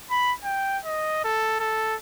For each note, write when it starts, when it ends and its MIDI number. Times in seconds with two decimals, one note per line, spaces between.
0.11 0.33 83
0.44 0.78 79
0.85 1.21 75
1.24 1.59 69
1.60 1.95 69